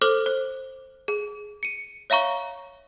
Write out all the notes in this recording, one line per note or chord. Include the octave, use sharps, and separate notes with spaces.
A4 C5 D6 F6 F#7
C5
G#4
C#7 D#7
C#5 E5 F5 A#5 C#6